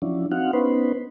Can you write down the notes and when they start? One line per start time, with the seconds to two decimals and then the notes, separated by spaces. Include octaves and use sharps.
0.02 F3 F#3 C#4 D4 E4
0.32 C4 D#4 F#4 F5 F#5
0.53 B3 C#4 D#4 B4 C5